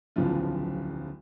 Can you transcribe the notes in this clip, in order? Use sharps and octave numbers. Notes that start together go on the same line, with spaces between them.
D1 B1 C#3 F3 F4